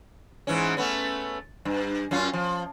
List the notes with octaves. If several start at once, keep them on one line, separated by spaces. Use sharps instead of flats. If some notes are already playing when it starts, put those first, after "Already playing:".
G#2 E3 C#4
A3 B3 C#4
G2
F#2 C#4 F4
F3